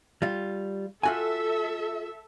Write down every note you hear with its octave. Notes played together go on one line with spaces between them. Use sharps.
G3 F4
F4 F#4 A4 E5 G#5